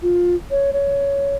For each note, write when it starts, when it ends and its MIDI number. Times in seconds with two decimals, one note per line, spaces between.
0.02 0.35 65
0.51 0.71 73
0.73 1.36 73